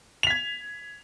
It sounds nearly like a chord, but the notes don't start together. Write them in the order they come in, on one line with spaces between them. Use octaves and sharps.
F7 B6 G#6